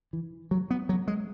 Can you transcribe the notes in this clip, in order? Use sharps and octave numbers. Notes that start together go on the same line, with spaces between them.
E3
F#3
B3
F#3
G#3